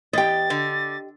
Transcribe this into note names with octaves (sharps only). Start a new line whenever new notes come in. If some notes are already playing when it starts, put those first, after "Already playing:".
E2 G4 D#5 G5 A6
D3